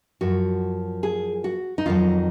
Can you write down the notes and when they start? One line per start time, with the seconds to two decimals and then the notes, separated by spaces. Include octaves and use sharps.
0.21 F#2 F3 F#4
1.03 G#4
1.44 F#4
1.78 D#4
1.86 F2 D#3 F#3 F4